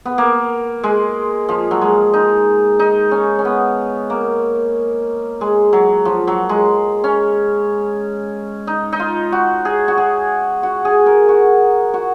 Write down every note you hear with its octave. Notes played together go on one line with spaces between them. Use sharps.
B3
A#3
G#3
F3
F#3
G#3
D#4
D#4
C#4
C#4
B3
A#3
G#3
F#3
F3
F#3
G#3
C#4
D#4
D#4
F4
F#4
G#4
F#4
G#4
F#4
G#4
A#4
F#4
F#4